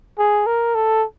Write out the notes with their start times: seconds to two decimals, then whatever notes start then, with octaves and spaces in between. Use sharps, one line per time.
0.19 G#4
0.46 A#4
0.75 A4